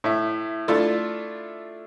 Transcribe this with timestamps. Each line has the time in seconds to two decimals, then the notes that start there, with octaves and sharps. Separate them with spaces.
0.04 A2 E5
0.68 A3 D4 E4 F4 A4